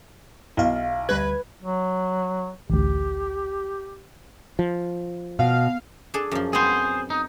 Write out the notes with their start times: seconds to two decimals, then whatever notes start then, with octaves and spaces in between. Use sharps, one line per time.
0.57 B1 E4 F5
1.09 D2 G3 B4 G#6
1.63 F#3
2.70 A1 D2 G4
4.59 F3
5.39 B2 F5
6.14 D4 G#4 A4
6.31 F#2 F3
6.53 B3 C4 G#4 C5
7.10 D#4